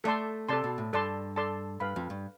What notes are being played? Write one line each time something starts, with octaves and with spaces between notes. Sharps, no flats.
A3 A4 D5 A5 C6
C3 A4 D5 A5 C6
B2
A2
G2 A4 D5 A5 C6
A4 D5 A5 C6
G2 B4 F5 B5
F2
G2